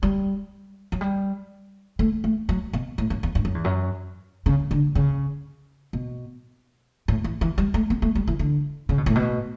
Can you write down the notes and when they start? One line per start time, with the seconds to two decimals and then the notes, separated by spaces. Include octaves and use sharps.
0.03 G3
0.92 F#3
1.01 G3
1.99 A3
2.24 A3
2.49 F#3
2.73 B2
2.98 A2
3.10 F#2
3.23 E2
3.35 G2
3.45 F#2
3.55 E2
3.64 F#2
4.46 C#3
4.71 D3
4.95 C#3
5.93 B2
7.08 A2
7.24 E3
7.41 E3
7.58 G3
7.74 A3
7.90 B3
8.02 A3
8.15 G3
8.28 E3
8.39 D3
8.89 C#3
8.98 B2
9.06 A2
9.15 B2